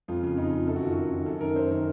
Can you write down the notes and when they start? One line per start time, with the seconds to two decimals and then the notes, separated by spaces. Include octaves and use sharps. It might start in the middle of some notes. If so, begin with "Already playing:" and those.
0.08 F2 F4
0.23 C#3 F4
0.37 F2 D#4
0.53 C#3 F4
0.67 F#2 A4
0.76 F#4
0.82 D#3 F4
0.93 F#2 F#4
1.12 D#3
1.26 F#2 A4
1.41 D#3 A#4
1.56 F#2 C5
1.71 D#3 A#4